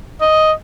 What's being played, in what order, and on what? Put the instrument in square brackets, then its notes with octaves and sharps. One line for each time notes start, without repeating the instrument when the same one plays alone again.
[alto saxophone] D#5